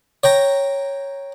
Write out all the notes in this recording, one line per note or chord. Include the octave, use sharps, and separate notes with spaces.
C#5 G5 A#5